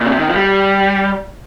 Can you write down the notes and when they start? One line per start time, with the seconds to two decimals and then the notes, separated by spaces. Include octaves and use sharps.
0.01 A#2
0.06 C#3
0.10 C3
0.20 D#3
0.28 F3
0.36 G3